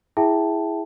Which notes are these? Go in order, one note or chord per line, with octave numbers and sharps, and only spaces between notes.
E4 G#4 E5 G5 A5